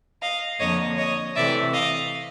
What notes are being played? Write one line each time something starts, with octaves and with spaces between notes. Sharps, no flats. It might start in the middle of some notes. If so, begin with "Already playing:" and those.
D#5 F5
F2 D3 F3 A#3 C#5 D#5
C#5 D#5
C3 E3 A3 D5 E5
D#5 F5